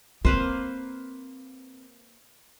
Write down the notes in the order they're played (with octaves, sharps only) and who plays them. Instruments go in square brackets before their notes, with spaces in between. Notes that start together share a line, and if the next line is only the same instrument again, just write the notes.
[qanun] A#3 B4 C5 [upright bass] C4